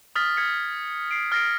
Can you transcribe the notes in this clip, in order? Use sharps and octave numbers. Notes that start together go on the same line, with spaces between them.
D#6 F6 A6 B6
F6 G#6 B6 C#7
C7 D7
F6 A6 A#6 C7 D7